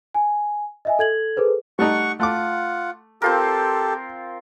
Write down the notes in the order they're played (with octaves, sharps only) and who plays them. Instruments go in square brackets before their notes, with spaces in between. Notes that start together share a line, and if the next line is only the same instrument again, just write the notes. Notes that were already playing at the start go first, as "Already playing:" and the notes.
[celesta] G#5
D#5 E5 G#5
A4 G#6 F#7
G#4 A4 B4 C5
[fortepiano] G3 A3 D#4 [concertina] F#5 C#6
[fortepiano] A3 D6 [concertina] F4 F#5
[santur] C4 F4 A#4 [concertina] G4 A4